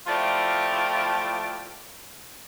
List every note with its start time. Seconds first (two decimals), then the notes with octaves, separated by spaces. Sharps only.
0.07 F3 A3 E4 F4 G4 D5